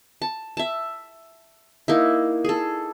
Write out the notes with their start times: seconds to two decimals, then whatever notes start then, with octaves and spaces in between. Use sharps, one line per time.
0.22 A5
0.57 E5 A5
1.88 A#3 D#4 E4
2.45 G#4 A4